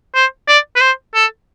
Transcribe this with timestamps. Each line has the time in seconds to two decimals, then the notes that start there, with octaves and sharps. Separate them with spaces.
0.15 C5
0.48 D5
0.76 B4
0.81 C5
1.15 A4